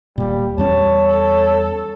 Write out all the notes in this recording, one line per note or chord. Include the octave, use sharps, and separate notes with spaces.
D#1 A#2 G3
E2 G3 C#4 C#5 A5
A4